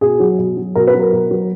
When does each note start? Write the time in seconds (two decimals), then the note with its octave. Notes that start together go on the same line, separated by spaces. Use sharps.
0.01 B2 G#4
0.20 F#3
0.38 B2
0.57 F#3
0.75 B2 A#4
0.87 B4
0.94 F#3
1.00 A#4
1.13 B2
1.31 F#3